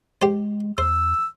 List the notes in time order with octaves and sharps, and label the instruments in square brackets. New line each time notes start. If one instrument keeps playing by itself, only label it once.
[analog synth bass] G#3 [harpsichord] G4 C5
[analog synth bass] E2 [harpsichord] C5 [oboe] E6